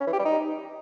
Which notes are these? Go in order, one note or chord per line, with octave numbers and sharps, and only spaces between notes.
C#4
E3
G4
G3
D#4